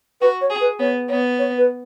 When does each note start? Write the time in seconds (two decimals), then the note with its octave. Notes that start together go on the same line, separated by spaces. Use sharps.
0.21 F#4 B4
0.41 C#5
0.50 G#4
0.61 B4
0.79 B3 C#5
1.09 B3 C#5
1.39 C#5
1.58 B4